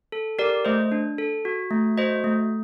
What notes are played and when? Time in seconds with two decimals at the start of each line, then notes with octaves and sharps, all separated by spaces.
0.12 A4
0.39 G4 A#4 D5
0.65 A3 C5 D#5
0.92 D4
1.18 A4
1.45 F#4
1.71 A3
1.98 F#4 C5 D#5
2.24 A3